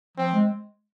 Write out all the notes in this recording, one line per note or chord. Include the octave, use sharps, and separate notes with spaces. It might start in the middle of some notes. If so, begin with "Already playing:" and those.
F3 C4
G#3